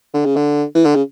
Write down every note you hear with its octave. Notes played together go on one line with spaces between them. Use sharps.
D3
C#3
D3
E3
D3
C#3